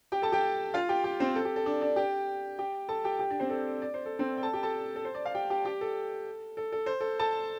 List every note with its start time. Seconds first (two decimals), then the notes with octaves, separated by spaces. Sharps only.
0.12 G4 G5
0.22 A4 A5
0.32 G4 G5
0.74 F4 F5
0.89 G4 G5
1.04 G4 G5
1.20 C4 C5
1.35 A4
1.45 G4
1.56 A4
1.66 D4 D5
1.81 D4 D5
1.96 G4 G5
2.59 G4 G5
2.89 A4 A5
3.04 G4 G5
3.19 G4 G5
3.30 D4 D5
3.40 C4 C5
3.50 A4
3.82 D5
3.94 C5
4.06 A4
4.19 C4 C5
4.37 G5
4.42 A4 A5
4.53 G4 G5
4.63 A4 A5
4.96 A4
5.05 C5
5.15 D5
5.25 F5
5.35 G4 G5
5.50 G4 G5
5.65 G4 G5
5.81 A4
6.57 A4
6.72 A4
6.86 C5
7.01 A4
7.20 A4 A5